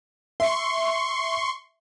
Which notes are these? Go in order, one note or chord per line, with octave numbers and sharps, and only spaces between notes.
E5 C6 C#6